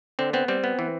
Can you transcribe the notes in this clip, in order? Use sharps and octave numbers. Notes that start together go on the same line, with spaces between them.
D3 C4
B3 C4
G3 C4
B3
E3